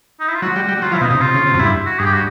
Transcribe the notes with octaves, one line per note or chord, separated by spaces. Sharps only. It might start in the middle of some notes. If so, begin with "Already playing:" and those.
D#4
E4
F4
F#3 F#4
G3
G3
F#3 F4
F3 E4
B2 D#4
C3
C3 F4
C#3
C3
F#2
G2 E4
F#4
G2 G#4
G4
F#4